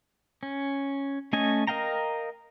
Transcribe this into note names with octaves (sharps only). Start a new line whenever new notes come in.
C#4
A3 C#4 A4 D#5 G#5
A#4 D#5 F5 G5 A#5